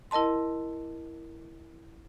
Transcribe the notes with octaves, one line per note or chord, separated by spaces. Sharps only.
E4 A#4 D#5 A5 C6